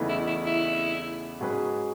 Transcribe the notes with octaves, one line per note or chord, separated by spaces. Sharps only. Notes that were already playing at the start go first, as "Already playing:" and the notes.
Already playing: E2 C#3 E3 A3 D#4
E4
E4
E4
G#2 F#3 C#4 G#4 B4